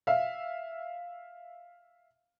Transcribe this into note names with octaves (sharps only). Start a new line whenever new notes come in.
E5 F5